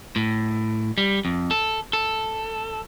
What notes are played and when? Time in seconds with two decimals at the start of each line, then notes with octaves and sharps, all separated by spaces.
0.16 A2
0.98 G3
1.25 F2
1.51 A4
1.93 A4